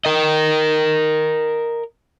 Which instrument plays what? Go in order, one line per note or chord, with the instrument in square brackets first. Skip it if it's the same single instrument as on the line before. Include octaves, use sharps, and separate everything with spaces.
[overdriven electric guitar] A#4 D#5